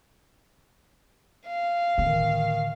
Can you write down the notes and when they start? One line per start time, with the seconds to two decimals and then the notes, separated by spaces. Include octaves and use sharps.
1.47 F5
1.98 A2 D3 D#3